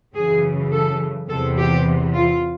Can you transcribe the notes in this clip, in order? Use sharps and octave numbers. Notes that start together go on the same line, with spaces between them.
F#2 C#3 E3 G#4
A4
E2 C3 E3 A4
G4
F4